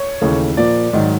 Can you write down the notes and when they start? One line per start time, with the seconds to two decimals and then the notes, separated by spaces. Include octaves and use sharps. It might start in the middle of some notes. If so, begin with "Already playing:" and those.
Already playing: C#5
0.21 D#2 C#3 E3 A3
0.57 A#2 F3 A#3 D5
0.93 G#2 D#3 F#3